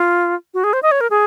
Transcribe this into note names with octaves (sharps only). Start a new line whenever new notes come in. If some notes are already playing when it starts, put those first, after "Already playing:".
Already playing: F4
F#4
G#4
C5
D#5
C#5
A#4
G#4